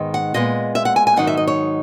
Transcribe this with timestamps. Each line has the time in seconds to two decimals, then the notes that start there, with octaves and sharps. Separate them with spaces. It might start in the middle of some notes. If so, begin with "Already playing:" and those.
Already playing: G#2 D#3 G#3 B3
0.14 F#5
0.34 A#2 G#3 B3 D#5
0.75 E5
0.85 F#5
0.96 G#5
1.07 G#5
1.16 G#2 D#3 F#3 D#4 F#5
1.27 E5
1.37 D#5
1.47 C#5